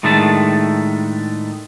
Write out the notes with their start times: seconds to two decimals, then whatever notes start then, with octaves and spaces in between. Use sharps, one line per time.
0.03 A2 D#3 G#3 A3 D4 A5